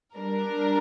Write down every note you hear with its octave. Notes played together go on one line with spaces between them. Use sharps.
G3 D4 A#4